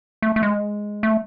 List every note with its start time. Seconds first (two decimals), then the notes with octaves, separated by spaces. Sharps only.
0.22 A3
0.36 A3
0.43 G#3
1.03 A3